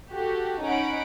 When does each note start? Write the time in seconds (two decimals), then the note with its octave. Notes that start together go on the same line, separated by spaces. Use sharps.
0.11 F#4 G4 A4
0.64 C#4 D#4 F#5 B5 D7